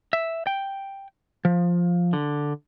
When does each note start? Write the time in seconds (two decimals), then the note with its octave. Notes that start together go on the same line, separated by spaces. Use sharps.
0.13 E5
0.47 G5
1.45 F3
2.13 D3